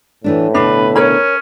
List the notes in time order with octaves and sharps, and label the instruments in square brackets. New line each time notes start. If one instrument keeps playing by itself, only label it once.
[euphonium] A2 [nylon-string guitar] E3 A3 D4
[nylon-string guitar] B2 D3 [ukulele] D4 [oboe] B4
[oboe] C#4 [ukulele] A#4 C#5 B5